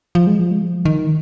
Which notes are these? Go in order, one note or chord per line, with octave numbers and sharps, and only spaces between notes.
F3
G#3
F3
G#3
F3
D#3